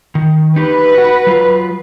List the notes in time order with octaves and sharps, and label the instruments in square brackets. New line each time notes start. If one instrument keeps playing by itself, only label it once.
[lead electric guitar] D#3
[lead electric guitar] D#4 G4 [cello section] B4
[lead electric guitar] F#4 F#5
F#3 F4